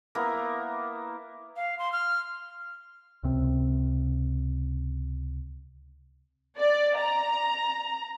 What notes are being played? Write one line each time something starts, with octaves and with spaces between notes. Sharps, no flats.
A#3 B3 E4 A#4
F5
C6
F6
C#2 C3 C4
D5
A#5